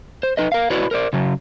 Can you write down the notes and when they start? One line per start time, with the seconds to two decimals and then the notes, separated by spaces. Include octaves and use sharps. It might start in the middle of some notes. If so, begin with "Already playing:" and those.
0.23 C5
0.37 D#4 B4 D#5
0.52 A#4 F5
0.70 E4 F#4 B4 C#5 D5
0.91 A#4 C5 D5
1.13 C#3 F#3